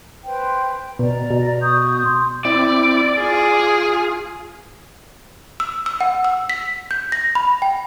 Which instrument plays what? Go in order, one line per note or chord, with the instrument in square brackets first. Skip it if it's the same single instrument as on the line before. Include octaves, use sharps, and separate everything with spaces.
[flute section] B4 C5 G5
[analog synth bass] B2 [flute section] D5 A#5
[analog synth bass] B2
[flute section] C#6 D#6 G6
C6
[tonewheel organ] C4 E4 D6 [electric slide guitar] D5
[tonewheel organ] F4 [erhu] G#4
[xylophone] E6
E6
F#5
E6
B6
G6
A#6
B5
G5